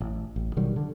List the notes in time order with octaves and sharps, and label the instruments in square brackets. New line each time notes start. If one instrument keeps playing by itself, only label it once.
[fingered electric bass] A1
A1
B2 D#3 F#3 G3
D3